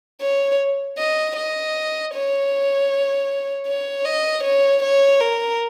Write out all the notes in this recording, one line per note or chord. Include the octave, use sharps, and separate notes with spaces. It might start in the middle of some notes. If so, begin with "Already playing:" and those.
C#5
D#5
D#5
C#5
C#5
D#5
C#5
C#5
A#4